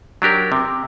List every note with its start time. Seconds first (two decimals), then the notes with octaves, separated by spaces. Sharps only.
0.22 F#3 D4 G4 A#4
0.52 C3